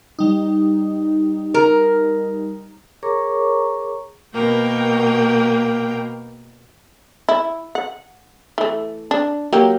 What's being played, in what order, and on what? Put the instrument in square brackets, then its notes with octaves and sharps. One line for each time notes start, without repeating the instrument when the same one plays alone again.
[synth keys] G3 D#4
[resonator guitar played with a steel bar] A#4
[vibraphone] G#4 A#4 C#5 A#5 C#6 D6
[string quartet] B2 A#3 A#4 G5
[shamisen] E4
F#5
E3 A3
D4
F#3 A#3 G4